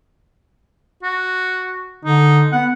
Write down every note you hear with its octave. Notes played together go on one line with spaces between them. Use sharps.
F#4
D3 D#4
B3 F#5